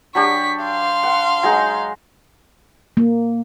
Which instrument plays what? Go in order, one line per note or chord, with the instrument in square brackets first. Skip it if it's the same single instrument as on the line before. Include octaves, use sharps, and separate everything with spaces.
[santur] F#3 D4 G4 [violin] C#6 B6
[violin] F5 C6
[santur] F#5
F#3 G#3 D#4
[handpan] A#3